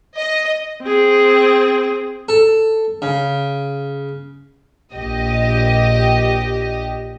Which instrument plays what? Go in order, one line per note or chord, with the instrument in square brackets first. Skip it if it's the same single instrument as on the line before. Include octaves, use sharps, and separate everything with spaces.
[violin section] D#5
[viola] C4 G#4
[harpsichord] A4
C#3
[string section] A#1 G4 D#5